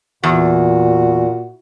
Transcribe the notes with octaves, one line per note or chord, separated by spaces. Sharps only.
E2 A#2 F#4